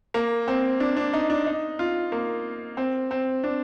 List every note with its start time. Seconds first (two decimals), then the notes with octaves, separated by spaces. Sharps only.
0.14 A#3
0.48 C4
0.80 D4
0.97 D4
1.13 D#4
1.30 D4
1.46 D#4
1.79 F4
2.12 A#3
2.77 C4
3.11 C4
3.44 D4